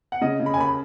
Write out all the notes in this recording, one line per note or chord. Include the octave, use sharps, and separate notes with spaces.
F#5
C#3 D#5
C#3
B5
G#5
D#2 B5